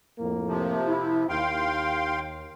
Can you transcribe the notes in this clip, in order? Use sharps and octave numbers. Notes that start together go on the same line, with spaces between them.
F2 A2 A#3
C3 F3
E4
D#2 F5 G5 C6